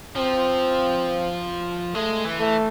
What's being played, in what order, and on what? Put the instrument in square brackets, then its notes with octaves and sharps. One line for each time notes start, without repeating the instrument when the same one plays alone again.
[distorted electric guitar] F3 [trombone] C4
[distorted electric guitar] G#3 [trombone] A3
[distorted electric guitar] E3
[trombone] A3